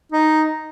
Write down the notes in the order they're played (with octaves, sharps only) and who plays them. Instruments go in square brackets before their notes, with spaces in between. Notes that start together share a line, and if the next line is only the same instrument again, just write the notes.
[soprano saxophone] D#4